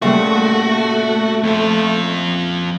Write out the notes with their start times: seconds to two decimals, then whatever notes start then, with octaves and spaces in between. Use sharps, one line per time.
0.02 A#2 C#3 G3 A3 F#4
1.43 F2 F4